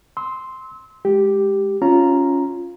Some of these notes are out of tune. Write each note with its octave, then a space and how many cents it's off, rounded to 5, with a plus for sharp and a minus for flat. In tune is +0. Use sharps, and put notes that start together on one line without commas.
C6 +0 E6 -30
G#3 +0 G4 +0
C#4 +0 F4 +0 A#5 +0